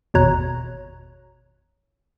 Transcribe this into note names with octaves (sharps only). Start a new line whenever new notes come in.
G#1 E2 B2 C#5 A#5 F#6